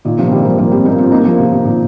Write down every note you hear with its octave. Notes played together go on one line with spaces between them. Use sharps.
A#2 D#3
C3 F3
A#3
D#3 G3
F3 A#3
F3 A#3
G3 C4
A#3 D#4
C4 F4
A#3 D#4
F3 A#3
C3
C3
A#2 D#3